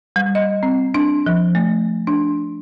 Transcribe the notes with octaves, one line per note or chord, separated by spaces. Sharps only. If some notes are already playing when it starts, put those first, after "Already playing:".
G3
D#5
C4
D4
F3
A3
D4